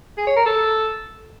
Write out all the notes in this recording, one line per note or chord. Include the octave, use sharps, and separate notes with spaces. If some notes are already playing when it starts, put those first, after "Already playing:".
G#4
C#5
A#4
A4